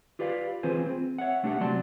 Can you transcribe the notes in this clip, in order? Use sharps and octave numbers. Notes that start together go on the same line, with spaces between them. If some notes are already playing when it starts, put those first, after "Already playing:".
F4 G4 B4 D5 F5
E3 C4 F4 G#4 B4 C5
C4
C#5 E5 F#5
B1 A3 D4 F4 G4 F#5
C2 F#3 C4 D5 A5 C6